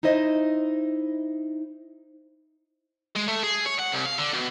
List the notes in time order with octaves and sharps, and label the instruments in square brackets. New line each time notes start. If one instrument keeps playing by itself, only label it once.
[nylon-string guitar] D#4 E4 C5 D#5
[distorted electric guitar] G#3
A3
G#4
C#5
F#5
C2
F5
D3
B2